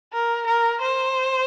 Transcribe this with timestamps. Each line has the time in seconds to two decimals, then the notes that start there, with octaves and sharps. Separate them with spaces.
0.13 A#4
0.47 A#4
0.81 C5